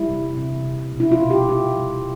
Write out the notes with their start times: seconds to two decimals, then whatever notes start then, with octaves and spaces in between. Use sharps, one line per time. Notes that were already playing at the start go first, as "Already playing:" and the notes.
Already playing: G3 E4
0.09 C3
0.37 C3
0.65 C3
0.92 B2
1.00 E4
1.12 F4
1.21 B2
1.30 G4
1.49 G3 F4
1.77 G3